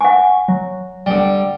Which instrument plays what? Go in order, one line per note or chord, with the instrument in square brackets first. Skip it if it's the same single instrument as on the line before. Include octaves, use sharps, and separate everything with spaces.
[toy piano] F#5 G#5 [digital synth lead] C#6
[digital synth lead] F#3
[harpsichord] D3 G3 [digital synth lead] G5